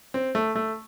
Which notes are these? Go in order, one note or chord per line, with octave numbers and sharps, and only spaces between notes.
C4
A3
A3